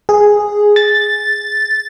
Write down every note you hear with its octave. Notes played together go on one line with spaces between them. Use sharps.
G#4
A6